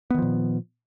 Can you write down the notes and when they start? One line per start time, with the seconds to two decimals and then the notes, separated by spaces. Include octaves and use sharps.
0.11 B3
0.14 D#3
0.18 F3
0.22 A#2